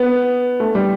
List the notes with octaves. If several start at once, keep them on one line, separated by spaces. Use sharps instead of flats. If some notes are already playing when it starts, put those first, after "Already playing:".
Already playing: B3
A3
G3